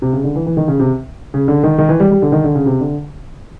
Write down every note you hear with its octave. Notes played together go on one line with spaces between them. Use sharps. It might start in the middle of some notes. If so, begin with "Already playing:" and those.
C3
C#3
D3
E3
E3
D#3
C#3
C3
C#3
D3
D#3
D#3
E3
G3
G3
D3
D#3
D3
C#3
C3
D3